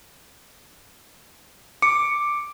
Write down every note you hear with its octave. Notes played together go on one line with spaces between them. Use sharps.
D6 C#7